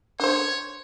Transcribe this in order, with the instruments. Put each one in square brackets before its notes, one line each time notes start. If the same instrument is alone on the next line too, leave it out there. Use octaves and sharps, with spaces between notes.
[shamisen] D4 C5 [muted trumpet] C#5